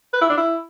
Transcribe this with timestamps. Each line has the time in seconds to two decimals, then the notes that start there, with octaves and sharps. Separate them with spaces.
0.14 B4
0.22 E4
0.29 D4
0.37 E4